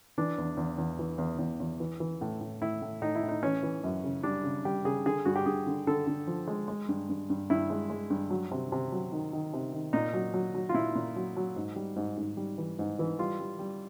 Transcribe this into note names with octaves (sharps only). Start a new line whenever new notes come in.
E3 D4
E2
E2
E2
E3
E2
E2
E2
E3
E3
A2
A2
A2 E4
A2
A2 D#4
E4
A2
D#4
E3 C#4
E3
F#2
C#3
G3 D4
C#3
G3 G4
C#3 G#4
D3 G#4
G2 F#4
G4
G2 G#4
D3
D3 A4
D3
F3
G#3
G#3
G2
G2
G2
G2 E4
G#3
G#3
G2
F#3
C3
C3
F#3
D#3
D#3
C3
D#3
A#2 D#4
F#3
F#3
F#3
F4
A#2 E4
A#2
F#3
F#3
G#2
G3
G#2
G#2
G3
E3
G#2
E3
G3 F4
G3
G3